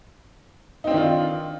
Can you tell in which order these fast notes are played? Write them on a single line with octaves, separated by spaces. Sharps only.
D#4 C4 D4 D#3 F4